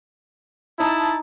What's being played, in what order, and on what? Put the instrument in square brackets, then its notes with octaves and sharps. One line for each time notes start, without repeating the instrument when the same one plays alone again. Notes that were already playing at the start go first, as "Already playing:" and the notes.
[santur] D#4 [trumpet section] E4 A5